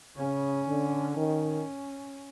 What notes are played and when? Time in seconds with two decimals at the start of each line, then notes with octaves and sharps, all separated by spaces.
0.17 C#3 C#4
0.67 D3
1.16 D#3 C#4